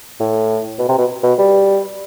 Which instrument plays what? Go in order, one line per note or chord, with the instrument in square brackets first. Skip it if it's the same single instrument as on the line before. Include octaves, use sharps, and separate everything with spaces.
[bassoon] A2
B2
C3
B2
B2
G3